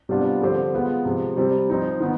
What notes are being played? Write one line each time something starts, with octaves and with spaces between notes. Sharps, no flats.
C3 G3 B3 D4 F4
D3 F3 C4 G4 C5
G#3 B3 F4 B4
C3 F3 G#3
C3 G3 C4
F3 C4 D#4
D#3 B3